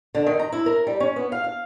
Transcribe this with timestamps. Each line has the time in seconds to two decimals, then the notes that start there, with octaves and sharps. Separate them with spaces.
0.15 D3
0.26 D#3
0.39 A#5
0.52 E4
0.66 A#4
0.87 G3
1.00 C#4
1.16 B3
1.32 F5
1.44 F5